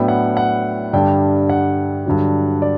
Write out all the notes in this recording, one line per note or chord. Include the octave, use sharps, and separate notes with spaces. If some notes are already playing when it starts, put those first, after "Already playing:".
Already playing: A2 F#3 B3 D4 G5
F#5
F#5
G2 D3 G3 D4 G5
F#5
G2 D3 F#3
D5